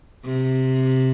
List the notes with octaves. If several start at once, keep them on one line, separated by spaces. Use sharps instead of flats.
C3